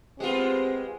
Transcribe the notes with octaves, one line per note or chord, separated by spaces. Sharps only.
G#3 B3 C4 F4 G4